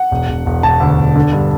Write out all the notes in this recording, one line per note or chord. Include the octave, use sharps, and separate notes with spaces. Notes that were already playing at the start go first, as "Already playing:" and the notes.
Already playing: F#5
E1
E1
E1
E1 A5
D2
E1
D3
G2